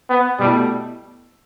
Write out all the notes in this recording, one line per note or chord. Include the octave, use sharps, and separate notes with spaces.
B3
B2 G3 A3 E4